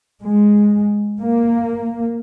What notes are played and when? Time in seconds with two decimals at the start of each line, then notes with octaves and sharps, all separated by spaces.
0.24 G#3
1.20 A#3